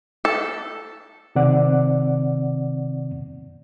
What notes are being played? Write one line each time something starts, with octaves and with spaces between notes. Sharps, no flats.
A4
C3 D#3 C4 D5 F#5